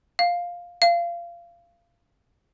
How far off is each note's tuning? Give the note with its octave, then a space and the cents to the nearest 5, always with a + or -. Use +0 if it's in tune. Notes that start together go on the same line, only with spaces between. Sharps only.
F5 +5
F5 -25